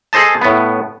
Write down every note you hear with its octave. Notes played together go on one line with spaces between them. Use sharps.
G#4 A4 C5 D#5 A5
A2 B3